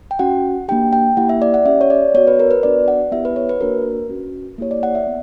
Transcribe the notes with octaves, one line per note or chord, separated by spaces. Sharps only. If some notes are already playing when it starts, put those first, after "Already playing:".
G5
C#4 F#4 F#5
A#3 D4 G4 G5
G5
A#3 E4 G4 F#5
E5
D5
F#5
C#4 G4 E5
C#5
D5
B3 F#4 C#5
B4
A#4
B4
B3 D4 F#4 D5
F#5
B3 E4 G4 E5
B4
C#5
B4
A#3 D4 F#4 A#4
C#4 F#4
A#3 E4 G4 C#5
D5
F#5
E5
B3